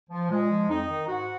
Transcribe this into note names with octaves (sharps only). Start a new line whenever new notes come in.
F3
A#2 G#3
F3
F2 D#4
D#3
G#2 F#4